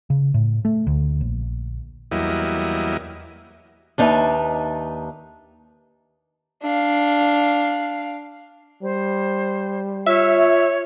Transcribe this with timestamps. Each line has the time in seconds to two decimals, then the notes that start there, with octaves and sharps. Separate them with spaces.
0.10 C#3
0.34 A2
0.65 A3
0.87 D2
1.21 A#1
2.11 E2 F#3 G3 A#3 E4 D#5
3.98 D#2 D4 D#4 B4 E5
6.63 D4 F5
8.83 G3 C5
10.06 F4 C#5 E5